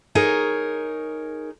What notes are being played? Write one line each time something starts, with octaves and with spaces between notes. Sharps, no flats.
D#4 G#4 A#4 C#5